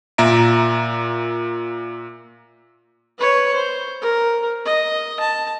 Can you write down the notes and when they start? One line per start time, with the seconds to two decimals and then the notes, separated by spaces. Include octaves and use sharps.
0.18 A#2 A#3 E5 A#5 D7
3.19 B4 C#5
3.54 C5
4.02 A#4
4.66 D#5
5.21 A5